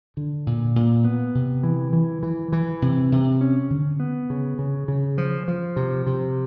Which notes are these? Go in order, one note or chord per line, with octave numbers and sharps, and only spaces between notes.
D3
A#2
A#2
B3
C3
E3
E3
E3
E3
C3
C3
C#4
D3
B3
C#3
C#3
C#3
F3
F3
C3
C3